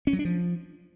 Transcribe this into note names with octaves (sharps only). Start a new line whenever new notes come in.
C#4
F#3
D4
F3